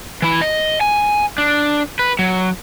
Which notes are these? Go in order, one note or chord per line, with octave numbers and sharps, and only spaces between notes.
E3 E4
D#5
G#5
D4
B4
F#3